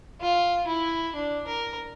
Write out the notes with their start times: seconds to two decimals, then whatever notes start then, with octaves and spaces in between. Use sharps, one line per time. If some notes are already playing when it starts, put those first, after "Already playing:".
0.21 F4
0.68 E4
1.15 D4
1.47 A#4